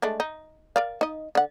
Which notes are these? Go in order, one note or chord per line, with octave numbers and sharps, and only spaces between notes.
G#3 A3 D4
D#4
A#4 D5 F5
D#4 D#5
D3 F#5